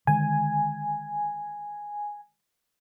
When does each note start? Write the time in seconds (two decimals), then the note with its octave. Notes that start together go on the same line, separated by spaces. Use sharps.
0.07 D3 D#3 G#3 G#5